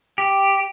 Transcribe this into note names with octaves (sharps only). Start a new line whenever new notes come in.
G4